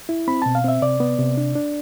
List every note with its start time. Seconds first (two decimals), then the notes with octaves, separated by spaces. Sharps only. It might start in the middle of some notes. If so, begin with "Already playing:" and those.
0.09 E4
0.28 C4 B5
0.42 B2 A5
0.55 F5
0.64 C4 E5
0.82 C3 D5
1.00 B3
1.19 C3
1.37 D4
1.55 D4